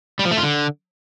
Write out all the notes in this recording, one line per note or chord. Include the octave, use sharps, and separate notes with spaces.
G3
F3
A3
F4
D3